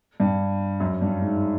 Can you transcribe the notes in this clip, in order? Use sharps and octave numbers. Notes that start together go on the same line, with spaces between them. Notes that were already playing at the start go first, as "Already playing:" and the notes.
G2
F#2
G2
G#2